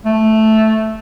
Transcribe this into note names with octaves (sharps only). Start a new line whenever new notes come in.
A3